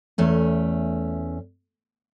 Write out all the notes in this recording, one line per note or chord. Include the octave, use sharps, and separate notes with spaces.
E2 A3 C#4